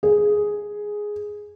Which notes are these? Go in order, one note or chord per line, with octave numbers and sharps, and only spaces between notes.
G#4